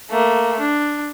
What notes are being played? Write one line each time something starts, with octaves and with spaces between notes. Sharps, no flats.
A3 A#3
D4